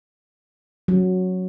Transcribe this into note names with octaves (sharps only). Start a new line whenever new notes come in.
F#3